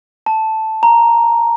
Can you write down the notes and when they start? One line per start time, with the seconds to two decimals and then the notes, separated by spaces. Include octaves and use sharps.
0.26 A5
0.83 A#5